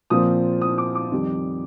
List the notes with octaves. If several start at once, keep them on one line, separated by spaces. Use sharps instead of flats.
A#2 F3 C4 D#6
D#6
D6
D6
F2 D#3 G3